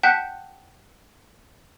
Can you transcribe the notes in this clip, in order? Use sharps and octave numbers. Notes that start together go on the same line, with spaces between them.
F#5 G5 A5 F#6 G6 B6